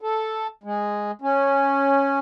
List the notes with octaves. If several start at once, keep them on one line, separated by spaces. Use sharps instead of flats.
A4
G#3
C#4